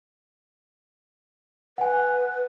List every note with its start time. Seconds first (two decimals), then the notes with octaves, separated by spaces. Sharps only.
1.78 B4 F#5 G#5